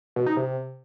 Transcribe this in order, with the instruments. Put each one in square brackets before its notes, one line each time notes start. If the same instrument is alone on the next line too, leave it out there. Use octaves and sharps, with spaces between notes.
[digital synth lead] B2
D#4
C3